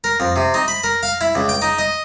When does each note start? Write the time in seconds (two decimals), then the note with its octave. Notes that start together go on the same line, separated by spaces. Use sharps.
0.04 A#4
0.20 F2
0.36 C3
0.54 D#4
0.68 B5
0.84 A#4
1.03 F5
1.21 E4
1.35 C#2
1.49 G5
1.62 D#4
1.79 D#5